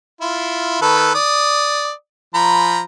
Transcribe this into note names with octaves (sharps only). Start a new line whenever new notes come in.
E4 F4
D#3 A4 B4
D5 D#6
F3 A#5 B5